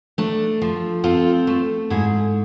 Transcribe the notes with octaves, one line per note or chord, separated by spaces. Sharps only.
A3 D4
F3
C4 F4 A4
A3
G#2 E4 G#4